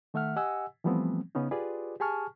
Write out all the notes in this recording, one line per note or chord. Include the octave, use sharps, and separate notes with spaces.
D#3 A3 E5 F#5 F6
G4 D#5 F#5 G#5 E6
E3 F3 G3 A3 B3 C4
C#3 B3 C#4 D#4
F4 G4 G#4 B4 D5
G4 G#4 G#5 A5 C#6 F6